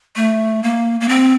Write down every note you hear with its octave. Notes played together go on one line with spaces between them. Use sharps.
A3
A#3
A#3
C4